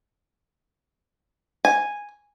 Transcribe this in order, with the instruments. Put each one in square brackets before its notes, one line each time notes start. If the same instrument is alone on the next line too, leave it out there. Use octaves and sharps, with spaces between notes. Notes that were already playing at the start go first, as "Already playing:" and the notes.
[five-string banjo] G#5